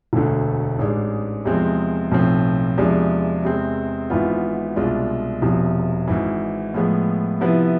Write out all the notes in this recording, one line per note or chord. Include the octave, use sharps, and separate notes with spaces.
E1 D2 D3 A3
A1 G#2 G#3 D4
E2 C3 F3 G#3 C4
B1 A2 F3 A3 C4
E2 C3 F3 G#3 D4
E2 C3 G#3 C4
G#1 G#2 E3 B3 F4
C2 B2 G#3 D4 F4
E1 E2 C3 F3
G#1 G#2 E3
A2 F3 G#3 B3
C3 F3 B3 E4 B4